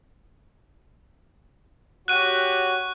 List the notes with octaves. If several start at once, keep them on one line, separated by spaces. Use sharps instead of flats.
F#4 G4 C#5 F#6 D#7